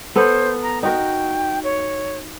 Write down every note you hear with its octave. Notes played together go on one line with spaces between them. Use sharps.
B3 A4 C5
A#5
D#4 F#4 A#4 G5
C#5